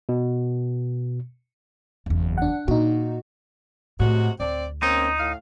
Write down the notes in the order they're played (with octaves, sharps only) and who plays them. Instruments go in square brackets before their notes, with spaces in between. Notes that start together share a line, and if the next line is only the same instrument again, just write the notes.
[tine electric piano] B2
[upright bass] F#1 E2
[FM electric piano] D4 F#5
[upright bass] A#2 [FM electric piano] D#4 F#4
[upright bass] A2 [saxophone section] C3 G#3 F#4
[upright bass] D2 [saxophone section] C4 D5
[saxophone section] A#3 C4 C#4 [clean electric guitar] D#4
[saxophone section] A2 F5